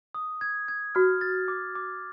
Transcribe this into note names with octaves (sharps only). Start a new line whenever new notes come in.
D#6
G#6
G#6
F#4 F6
A6
D6
D6